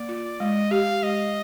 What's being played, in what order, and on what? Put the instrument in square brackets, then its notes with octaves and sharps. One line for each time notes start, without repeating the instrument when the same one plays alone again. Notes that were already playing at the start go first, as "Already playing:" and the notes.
Already playing: [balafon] A#3 [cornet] D5
[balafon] F4
[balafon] G#3 [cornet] D#5
[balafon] G4 [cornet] F5
[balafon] G#3 [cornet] D#5